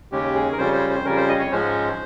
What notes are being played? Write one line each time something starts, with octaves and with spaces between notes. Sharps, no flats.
D#2 C#3 G#3 C#4 G4
G#4
A#4
F2 C#3 G3 C#4 C5
C5
C5
F2 C#3 G3 C#4 A#4
C5
D#5
C#5
G#2 F3 G#3 C#4 C5